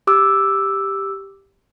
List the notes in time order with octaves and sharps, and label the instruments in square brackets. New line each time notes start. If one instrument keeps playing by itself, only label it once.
[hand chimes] G4 D6 E6